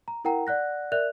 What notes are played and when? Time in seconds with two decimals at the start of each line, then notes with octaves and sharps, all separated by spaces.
0.08 A#5
0.25 E4 A#4 F#5 G5 A#5
0.47 D5 F#5 F#6 A#6
0.92 A#4 D5 E5 F#6 F7